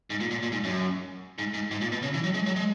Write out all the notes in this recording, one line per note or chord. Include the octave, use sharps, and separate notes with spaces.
G#2
A#2
A#2
A#2
G#2
F#2
G#2
G#2
G#2
A#2
B2
C#3
E3
F#3
G#3
F#3
G#3